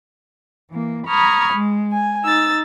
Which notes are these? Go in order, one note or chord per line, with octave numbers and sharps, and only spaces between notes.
E3 A#3
A#5 B5 C#6 D#6 F6 G#6
G#3
G#5
D#4 E6 A6